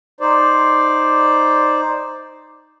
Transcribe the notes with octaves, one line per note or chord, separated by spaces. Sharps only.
D#4 C5 D5